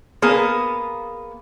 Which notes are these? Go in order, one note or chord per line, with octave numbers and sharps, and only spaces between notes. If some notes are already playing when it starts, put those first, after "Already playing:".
A#3 B3 G#4